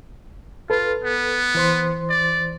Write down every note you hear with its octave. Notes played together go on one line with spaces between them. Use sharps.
F4 A4 B4
B3
E3 C5 C6
D5